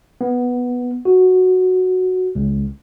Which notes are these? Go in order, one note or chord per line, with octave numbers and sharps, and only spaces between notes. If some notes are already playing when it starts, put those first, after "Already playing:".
B3
F#4
C#2